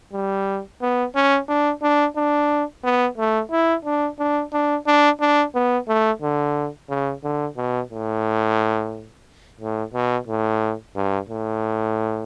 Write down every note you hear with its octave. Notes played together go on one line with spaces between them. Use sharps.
G3
B3
C#4
D4
D4
D4
B3
A3
E4
D4
D4
D4
D4
D4
B3
A3
D3
C#3
D3
B2
A2
A2
B2
A2
G2
A2